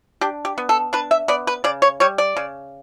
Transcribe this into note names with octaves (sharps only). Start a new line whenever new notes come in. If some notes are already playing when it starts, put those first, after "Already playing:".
D4 G4
G4
B3
A4
D4 B4
E5
B3 D5
B4
C#3 D5
C#5
G3 C#5
D5
C#3